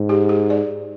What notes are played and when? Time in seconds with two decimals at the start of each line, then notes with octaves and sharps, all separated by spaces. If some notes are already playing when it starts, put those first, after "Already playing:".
Already playing: G#2
0.09 G4
0.29 G#4
0.50 D5